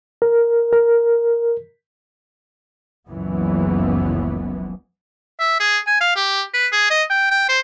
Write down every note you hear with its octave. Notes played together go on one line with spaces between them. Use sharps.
A#4
A#4
F#1 C#2 F#2 E3 F3 B3
E5
G#4
G#5
F5
G4
B4
G#4
D#5
G5
G5
C5